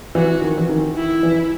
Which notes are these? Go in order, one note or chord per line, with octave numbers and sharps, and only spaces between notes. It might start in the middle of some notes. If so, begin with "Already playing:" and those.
E3 F#4
D#3
E3
D#3
E4
E3